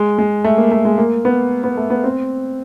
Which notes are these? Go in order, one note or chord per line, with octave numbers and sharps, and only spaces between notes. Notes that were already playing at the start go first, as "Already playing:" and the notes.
Already playing: G#3
G#3
A3
A#3
A3
G#3
A#3
B3
B3
A3
B3
C4